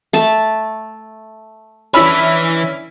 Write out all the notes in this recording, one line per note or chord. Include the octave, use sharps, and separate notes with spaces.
A3 A5
E3 C#4 D4 E4 B4 E5 B5